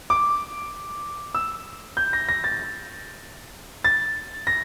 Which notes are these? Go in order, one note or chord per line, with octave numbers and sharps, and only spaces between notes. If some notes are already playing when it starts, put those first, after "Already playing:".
D6
E6
G6
A#6
A#6
A6
A6
A#6